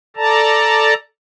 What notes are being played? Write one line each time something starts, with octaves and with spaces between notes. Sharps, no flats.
A4 D5 A5 A#5